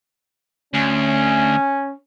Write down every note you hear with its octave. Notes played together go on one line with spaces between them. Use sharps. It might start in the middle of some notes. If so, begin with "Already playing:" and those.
D2 C#4